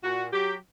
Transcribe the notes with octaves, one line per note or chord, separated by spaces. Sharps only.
A#2 F#4
F#3 G4